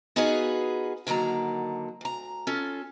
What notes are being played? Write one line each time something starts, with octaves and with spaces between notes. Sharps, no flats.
B3 D#4 F4 F#4 G#4 B4
D3 D#3 F#3 A#3 A#5
D2 A#5
C#4 F4 A4